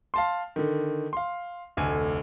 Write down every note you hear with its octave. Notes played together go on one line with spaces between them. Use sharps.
F5 A5 C6
D3 D#3
F5 C6
F1 D2 G#5